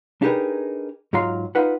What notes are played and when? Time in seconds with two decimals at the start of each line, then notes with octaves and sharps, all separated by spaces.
0.22 D4 D#4 G4 G#4 A#4 B4
1.13 G#2 F#3 F4 A#5 C6
1.55 D#4 F4 B4 F#5